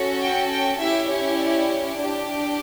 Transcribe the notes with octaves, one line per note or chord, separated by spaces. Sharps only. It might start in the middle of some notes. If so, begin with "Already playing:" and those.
Already playing: C#4 F#4 A4
G5
G5
C#4 E4 G4 E5
C#5
D5
D4 G4